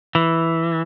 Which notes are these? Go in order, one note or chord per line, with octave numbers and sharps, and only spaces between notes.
E3